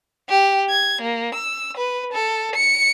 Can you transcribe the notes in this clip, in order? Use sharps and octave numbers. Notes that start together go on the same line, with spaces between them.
G4
G#6
A#3
E6
B4
A4
C#7